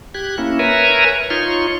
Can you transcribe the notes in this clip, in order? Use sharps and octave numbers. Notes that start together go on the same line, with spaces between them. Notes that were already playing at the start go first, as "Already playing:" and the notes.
G4 F#6 G#6
A#3 C#4 E4
A#4 B4 C#5 E5 G#5 A#5
D#4 F4 C#5 C6 C#6